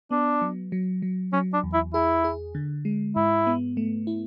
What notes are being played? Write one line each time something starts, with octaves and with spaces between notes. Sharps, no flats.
B3 D4
F#3
F#3
F#3
F#3 C#4
D4
E2
E4
E4 G#4
G#4
D3
G#3
G#2 E4
B3
A3
E4